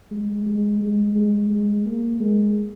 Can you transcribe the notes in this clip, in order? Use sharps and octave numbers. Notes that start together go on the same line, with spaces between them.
G#3
G#3
G#3
G#3
G#3
A#3
G#3